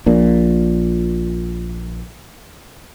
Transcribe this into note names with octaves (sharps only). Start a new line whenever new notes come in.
A#1 A#2